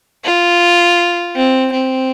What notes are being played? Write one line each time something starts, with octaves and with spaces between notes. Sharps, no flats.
F4
C4
C4